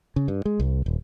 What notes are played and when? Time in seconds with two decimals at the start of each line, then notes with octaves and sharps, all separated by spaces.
0.16 C#3
0.28 G2
0.45 G#3
0.60 C2
0.86 D#1